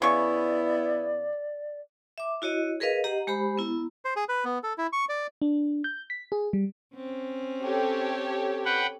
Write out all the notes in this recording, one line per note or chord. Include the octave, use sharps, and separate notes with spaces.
C#3 B3 E4 D5 C#6
E5 D6
E4 F#4 C#5 D#5
G#4 A#4 B4 D#5 F5
G4 D#5 F#5 A#5
G#3 G4 C5 B5
B3 E4 A#5
C5
G#4
B4
B3
A4
E4
C#6
D5
D4
G6
B6
G#4
G3
C4 C#4
G4 A4 C#5
B4 F#5 G5